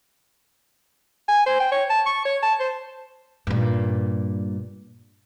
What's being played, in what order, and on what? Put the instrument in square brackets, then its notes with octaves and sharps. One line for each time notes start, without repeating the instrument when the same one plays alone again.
[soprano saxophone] G#5
C5
G5
C#5
A5
C#6
C#5
A5
C5
[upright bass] G2 A#2